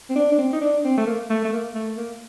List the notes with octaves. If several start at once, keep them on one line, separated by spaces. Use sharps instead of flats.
C4
D4
D4
C4
D#4
D4
C4
A3
A#3
A3
A3
A#3
A3
A#3